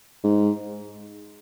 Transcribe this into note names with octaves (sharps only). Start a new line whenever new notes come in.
G#2